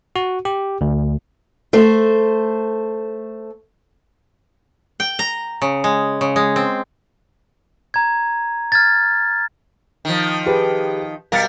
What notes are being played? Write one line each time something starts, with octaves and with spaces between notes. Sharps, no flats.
F#4
G4
D2
A3 C5
G5
A#5
C#3
G#3
C#3
G#3
C4
A#5 G#6
F6 G#6 A6
D#3 F3
G4 G#4 B4
B2 G3 A#4 F5 A6 C#7